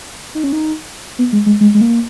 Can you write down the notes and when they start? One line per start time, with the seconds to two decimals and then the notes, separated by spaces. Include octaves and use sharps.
0.35 D#4
0.44 C#4
0.53 D#4
1.19 B3
1.33 G#3
1.46 G#3
1.61 G#3
1.75 G#3
1.81 A#3